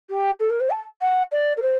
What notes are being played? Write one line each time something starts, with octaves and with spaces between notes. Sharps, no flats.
G4
A4
A#4
C5
A5
F#5
D5
A#4
C5